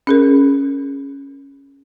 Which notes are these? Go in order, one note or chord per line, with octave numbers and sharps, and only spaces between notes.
C#4 G#4 A#4